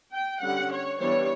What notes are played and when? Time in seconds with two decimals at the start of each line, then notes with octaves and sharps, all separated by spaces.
0.13 G5
0.42 D3 G3 C#4 F#5
0.72 C#5
1.00 E3 G3 B3 D4 C#5